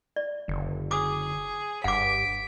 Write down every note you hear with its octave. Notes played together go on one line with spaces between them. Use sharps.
D5
F#1 D3
G#4 D6 D#6
F#1 G2 F#5 D6 B6 D7